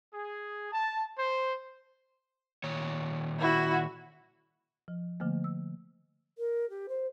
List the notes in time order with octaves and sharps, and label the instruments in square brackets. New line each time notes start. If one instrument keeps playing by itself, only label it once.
[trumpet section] G#4
A5
C5
[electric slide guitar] A#2 D#3 C#5
[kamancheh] E4 F#4
[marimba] F3
D3 F3 A3 A#3
E6
[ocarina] A#4
G4
C5